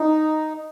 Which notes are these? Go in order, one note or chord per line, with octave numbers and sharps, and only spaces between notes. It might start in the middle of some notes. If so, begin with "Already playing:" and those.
Already playing: D#4